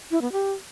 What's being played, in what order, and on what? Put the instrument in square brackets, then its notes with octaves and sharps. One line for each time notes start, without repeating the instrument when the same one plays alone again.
[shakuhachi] E4
B3
G4